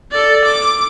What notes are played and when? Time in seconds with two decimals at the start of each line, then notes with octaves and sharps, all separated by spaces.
0.12 A4 D5
0.45 D6